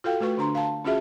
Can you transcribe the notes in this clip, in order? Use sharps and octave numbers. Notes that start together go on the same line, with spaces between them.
F4 F#4 A4 F5 G5
A3 F#4 B4 C#6
D3 D4 A#5 C6
F5 A5
C#4 F4 F#4 G#4 E5 A5